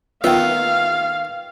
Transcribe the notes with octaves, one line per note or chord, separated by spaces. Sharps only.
D#3 B3 F4 E5 F5